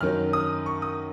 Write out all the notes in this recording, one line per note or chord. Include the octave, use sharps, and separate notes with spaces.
F#2 D#3 F#3 F6
D#6
C#6
D#6